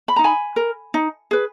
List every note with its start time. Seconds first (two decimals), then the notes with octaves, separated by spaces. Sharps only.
0.08 B5
0.16 D#4 A#5
0.24 G#5 B5
0.56 A#4
0.94 D#4
1.31 G#4 B4